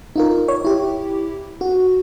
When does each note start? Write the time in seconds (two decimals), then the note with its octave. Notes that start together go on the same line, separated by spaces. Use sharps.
0.16 D#4 F4 A#4
0.48 C#5
0.65 E4 G4
1.61 F#4